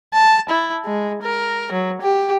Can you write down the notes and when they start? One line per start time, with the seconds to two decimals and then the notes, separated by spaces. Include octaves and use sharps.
0.14 A5
0.50 E4
0.85 G#3
1.23 A#4
1.73 F#3
2.02 G4